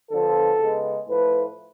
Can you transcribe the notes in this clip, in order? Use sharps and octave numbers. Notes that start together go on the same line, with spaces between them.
D3 F3 B3 A4
C#3 G#3 B3
A2 F3 A3 B4